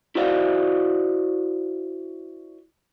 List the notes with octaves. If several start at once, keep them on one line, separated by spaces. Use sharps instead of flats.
E4 F#4 C5 D5 F5